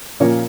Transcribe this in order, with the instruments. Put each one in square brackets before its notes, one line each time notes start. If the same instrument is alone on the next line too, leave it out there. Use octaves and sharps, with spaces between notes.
[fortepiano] A#2 F3 A#3 C#4 A#4 C#5